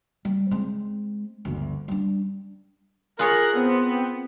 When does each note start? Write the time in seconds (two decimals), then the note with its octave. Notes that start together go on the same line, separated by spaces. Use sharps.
0.25 G3
0.51 G#3 C4
1.45 G1 D2
1.88 G3 D4
3.19 F4 G#4 A#4 C#5 F#6
3.57 B3 C4